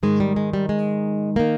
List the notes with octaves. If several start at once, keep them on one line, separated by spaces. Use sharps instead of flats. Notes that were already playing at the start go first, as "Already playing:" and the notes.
G#2 D#3 G#3
G3
G#3
G3
G#3
D#3 A#3